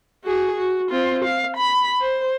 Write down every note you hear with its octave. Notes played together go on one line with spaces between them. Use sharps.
F#4 G#4
F#4
C4 F4
F5
B5
C5